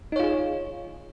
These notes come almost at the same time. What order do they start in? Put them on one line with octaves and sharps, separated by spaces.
D#4 C#5 F4 G#4